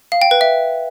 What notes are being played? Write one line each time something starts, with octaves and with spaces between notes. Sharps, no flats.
F5
G5
B4
E5